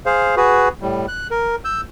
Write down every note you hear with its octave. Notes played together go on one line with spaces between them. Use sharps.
G#4 C5 F5
F#4 G#4 B4
A2 G3
F#6
A#4
E6 G6